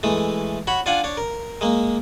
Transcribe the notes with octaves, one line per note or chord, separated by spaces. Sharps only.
E3 G#3 A3
F#4 C#5 B5
D4 F4 F5 F#5 G#5
D4 C#5
A#4
G#3 A#3